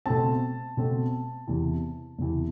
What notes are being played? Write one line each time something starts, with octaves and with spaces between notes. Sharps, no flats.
B2 A3 C4 A5
B2 A3 C4
E2 C3 E3
E2 C3 E3